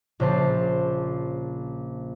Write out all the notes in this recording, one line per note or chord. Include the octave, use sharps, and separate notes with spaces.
A#1 C#3 C5 A5 C7